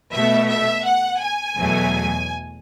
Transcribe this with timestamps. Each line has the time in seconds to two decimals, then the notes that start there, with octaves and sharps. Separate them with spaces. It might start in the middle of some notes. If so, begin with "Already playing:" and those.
0.13 B2 A3 E5
0.48 E5
0.85 F#5
1.20 G#5
1.55 E2 B2 F#3 A3